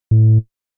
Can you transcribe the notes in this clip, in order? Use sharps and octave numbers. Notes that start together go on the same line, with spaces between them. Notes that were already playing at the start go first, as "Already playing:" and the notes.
A2